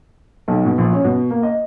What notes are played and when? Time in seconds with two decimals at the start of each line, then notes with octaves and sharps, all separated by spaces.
0.48 B1
0.65 B2
0.78 A#1
0.92 C#4
1.04 B2
1.30 A#3
1.43 D#5